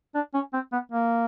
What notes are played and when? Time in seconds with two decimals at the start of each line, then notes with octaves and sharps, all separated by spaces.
0.15 D4
0.34 C#4
0.53 C4
0.73 B3
0.92 A#3